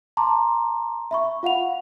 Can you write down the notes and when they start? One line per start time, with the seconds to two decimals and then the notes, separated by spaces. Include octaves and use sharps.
0.17 A5 A#5 C6 D6
1.11 E5 B5 C#6
1.43 F4 F5 F#5 F7